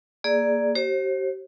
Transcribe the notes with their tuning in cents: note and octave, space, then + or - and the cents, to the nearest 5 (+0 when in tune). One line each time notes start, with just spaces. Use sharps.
A#3 +0 G#4 +0 D5 +0
G4 -40 C5 +35